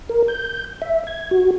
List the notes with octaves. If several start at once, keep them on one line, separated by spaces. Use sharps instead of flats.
A#4
G6
E5
G#6
F#4